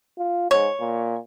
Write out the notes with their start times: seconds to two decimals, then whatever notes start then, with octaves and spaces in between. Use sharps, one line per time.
0.19 F4
0.51 G#2 C#5
0.80 A#2